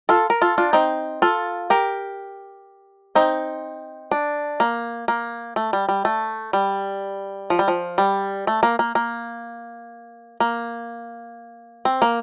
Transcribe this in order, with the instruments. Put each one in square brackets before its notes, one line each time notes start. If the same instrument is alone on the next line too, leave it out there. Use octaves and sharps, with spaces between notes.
[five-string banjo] F4 A4
A#4
F4 A4
D4 F4
C4 D#4
F4 A4
G4 A#4
C4 D#4
D4
A#3
A#3
A3
G3
G3
A3
G3
F3
G3
F3
G3
A3
A#3
A#3
A#3
A#3
C4
A#3